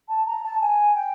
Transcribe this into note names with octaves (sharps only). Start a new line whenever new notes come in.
A5
A#5
A5
G#5
G5